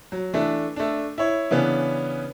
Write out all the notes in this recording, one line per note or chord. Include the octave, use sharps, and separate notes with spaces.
F#3
E3 A3 D4
A3 D4
E4 C#5
C#3 E3 B3 C#4 D4